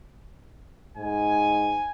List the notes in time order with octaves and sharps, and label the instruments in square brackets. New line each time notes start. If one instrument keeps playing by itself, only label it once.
[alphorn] G#2 [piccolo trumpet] G#5